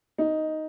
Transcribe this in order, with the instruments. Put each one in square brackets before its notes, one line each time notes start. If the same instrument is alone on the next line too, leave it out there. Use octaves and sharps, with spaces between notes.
[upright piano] D#4